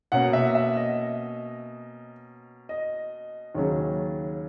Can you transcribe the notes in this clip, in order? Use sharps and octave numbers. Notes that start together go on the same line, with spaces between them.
B2 A#3 C#4 F#5
E5
E5
D#5
D#5
D#2 C#3 F#3 C#4